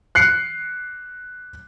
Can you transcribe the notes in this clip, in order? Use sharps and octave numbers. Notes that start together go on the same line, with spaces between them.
F#6 C7 C#7